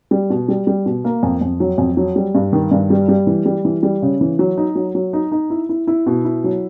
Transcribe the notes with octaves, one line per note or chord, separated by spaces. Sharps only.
G3
B2
G3
G3
B2
A#3
F2
F2
F#3
F2
F#3
G3
G2
D#3
G2
G3
G3
E3
G3
E3
G3
C#3
E3
F#3
D#4
F#3
F#3
D#4
D#4
E4
E4
E4
B2
E4
F#3